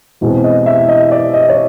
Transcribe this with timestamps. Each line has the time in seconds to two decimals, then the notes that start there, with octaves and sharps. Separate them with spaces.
0.21 E2 B2 G#3 C4
0.44 D#5
0.66 E5
0.88 D#5
1.12 D5
1.34 D#5
1.49 C#5